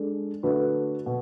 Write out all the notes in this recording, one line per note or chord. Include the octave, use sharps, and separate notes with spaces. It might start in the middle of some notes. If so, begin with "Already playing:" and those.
Already playing: G#3 D4 A4
D3 A3 D4 F#4 B4
B2